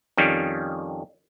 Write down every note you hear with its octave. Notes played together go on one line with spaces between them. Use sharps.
F2 D#3 G3 C#4